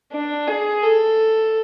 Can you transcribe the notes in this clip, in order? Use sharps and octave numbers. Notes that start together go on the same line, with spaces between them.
D4
G#4
A4